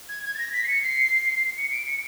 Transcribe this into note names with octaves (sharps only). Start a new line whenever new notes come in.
G#6
G#6
A6
A#6
B6
C7
C#7
C7
C#7
D7
C#7